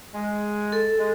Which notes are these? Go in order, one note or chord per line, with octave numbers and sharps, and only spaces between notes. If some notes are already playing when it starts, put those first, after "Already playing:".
G#3
A4
G#3